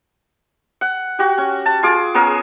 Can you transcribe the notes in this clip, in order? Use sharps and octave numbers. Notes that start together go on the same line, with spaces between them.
F#5
F#4 G4
C#4
A5
F4 G#4 D6
B3 C#4 G#4 A#4